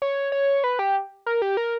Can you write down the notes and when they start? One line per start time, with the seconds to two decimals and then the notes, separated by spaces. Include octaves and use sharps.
0.02 C#5
0.32 C#5
0.64 B4
0.79 G4
1.26 A#4
1.42 G4
1.57 A#4